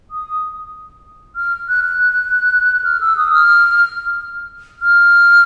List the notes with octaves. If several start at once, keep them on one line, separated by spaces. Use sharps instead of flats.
D#6
F6
F#6
F#6
F6
E6
D#6
F6
F6